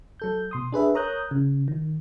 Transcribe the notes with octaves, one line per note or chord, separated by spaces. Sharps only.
F#3 A4 G6
B2 C6 D#6
D4 G#4 B4 E5
A#4 C#5 A#5 D#6 F#6 G6
C#3
D#3